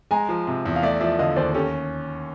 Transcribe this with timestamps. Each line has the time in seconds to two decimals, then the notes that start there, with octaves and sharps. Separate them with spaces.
0.11 G#3 G#5 A#5
0.29 F3
0.47 C3
0.65 E2
0.76 F5
0.82 A3 D5 E5
1.00 F3 D5 E5
1.19 D3 D#5 F5
1.36 D#2 C5 D5
1.54 C#4 G4 A4